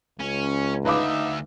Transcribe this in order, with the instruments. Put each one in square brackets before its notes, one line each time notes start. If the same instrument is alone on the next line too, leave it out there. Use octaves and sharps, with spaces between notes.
[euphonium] C#2 [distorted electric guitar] C#4
[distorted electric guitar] D2 E5 [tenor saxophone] D#4 [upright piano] B4 F5 D6